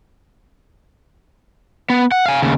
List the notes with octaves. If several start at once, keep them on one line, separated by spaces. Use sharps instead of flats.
B3
F#5
F5 G#5
D#2 C#3